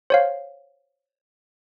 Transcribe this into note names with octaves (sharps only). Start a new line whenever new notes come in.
C5 C#5 F5